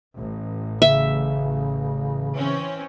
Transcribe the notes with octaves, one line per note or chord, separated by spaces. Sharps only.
A1
C#3 E5
E3 C4 C#4